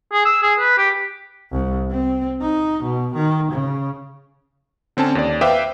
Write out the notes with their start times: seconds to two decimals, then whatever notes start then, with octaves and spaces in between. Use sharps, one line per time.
0.13 G#4
0.25 E6
0.43 G#4
0.59 B4
0.78 G4
1.52 C2
1.91 C4
2.42 D#4
2.84 B2
3.15 D#3
3.52 C#3
4.97 D3 C4 C#4 A5
5.15 D#2 D5
5.41 B4 C5 E5 F5 G5 D6